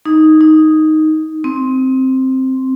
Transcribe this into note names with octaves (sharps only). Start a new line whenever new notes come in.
D#4
D#4
C4